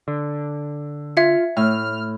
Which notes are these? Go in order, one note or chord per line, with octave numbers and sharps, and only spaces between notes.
D3
F4 E5 G#6 C#7
A2 F6